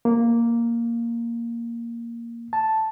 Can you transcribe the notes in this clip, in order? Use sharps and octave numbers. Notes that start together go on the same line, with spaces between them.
A#3
A5